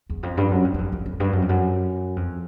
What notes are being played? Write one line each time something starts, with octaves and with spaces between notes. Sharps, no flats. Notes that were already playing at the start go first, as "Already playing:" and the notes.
E2
F2
G2
F#2
F2
F#2
F2
F2
F2
G2
F#2
F2
F#2
F2